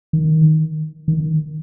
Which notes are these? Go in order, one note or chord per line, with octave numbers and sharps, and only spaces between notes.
D#3
D#3